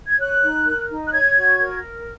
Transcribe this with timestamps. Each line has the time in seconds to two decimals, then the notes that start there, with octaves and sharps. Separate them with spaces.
0.07 G#6
0.19 C#5 F#6
0.42 D#4
0.66 A#4
0.89 D#4
1.07 F#6
1.12 C#5 G#6
1.36 F#4
1.59 A#4